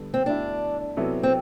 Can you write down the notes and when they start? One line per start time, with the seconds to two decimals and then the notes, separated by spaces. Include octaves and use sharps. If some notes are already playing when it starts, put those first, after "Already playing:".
Already playing: D3 G3 B3 A4
0.14 C4
0.26 B2 A3 D4 E4
0.97 C3 F#3 B3 E4 A4
1.23 C4